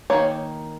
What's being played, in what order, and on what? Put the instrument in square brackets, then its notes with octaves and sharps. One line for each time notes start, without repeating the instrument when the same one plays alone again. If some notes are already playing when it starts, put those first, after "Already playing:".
[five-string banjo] D#3 F#3 A#3 C#5